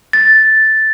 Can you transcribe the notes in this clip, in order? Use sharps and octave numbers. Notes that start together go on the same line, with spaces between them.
A6